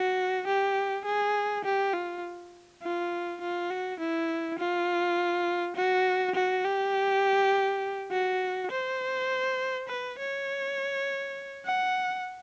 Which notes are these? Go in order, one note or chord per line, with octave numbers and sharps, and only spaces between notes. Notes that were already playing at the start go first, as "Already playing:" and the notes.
Already playing: F#4
G4
G#4
G4
F4
F4
F4
F#4
E4
F4
F#4
F#4
G4
F#4
C5
B4
C#5
F#5